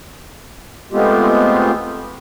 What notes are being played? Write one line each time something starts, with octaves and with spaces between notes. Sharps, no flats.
G#3 A3 B3 C4 F4 G4